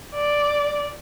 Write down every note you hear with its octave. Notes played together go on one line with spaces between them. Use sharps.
D5